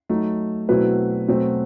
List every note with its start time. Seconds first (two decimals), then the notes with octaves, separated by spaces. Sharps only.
0.09 F#3 A3 D#4
0.69 B2 F#3 A3 C4 E4 B4
1.28 B2 F#3 A3 C4